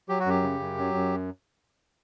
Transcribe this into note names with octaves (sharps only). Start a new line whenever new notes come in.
F#3 G4
F#4
F#2 G4
C#3
F#2
F#3
F#2